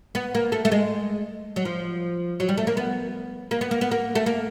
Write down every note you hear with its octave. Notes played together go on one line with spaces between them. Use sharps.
B3
A#3
A3
A3
G#3
F#3
F3
F#3
G3
A3
A#3
B3
A#3
B3
A#3
B3
A#3
A3
A#3